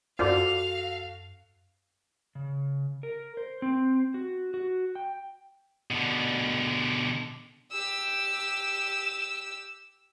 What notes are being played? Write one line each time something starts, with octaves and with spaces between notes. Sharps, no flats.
F#2 F4 F#4 A4 C5 D5 F5
C#3
A#4
C5
C4
F#4
F#4
G5
B2 D3
G4 E6